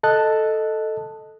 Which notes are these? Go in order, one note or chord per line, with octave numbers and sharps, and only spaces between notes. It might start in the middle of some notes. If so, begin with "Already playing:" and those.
A4 D#5 A5 F#6